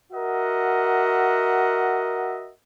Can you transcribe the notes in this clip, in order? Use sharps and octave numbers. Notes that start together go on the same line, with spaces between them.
F#4 A#4 D#5 E5 F#5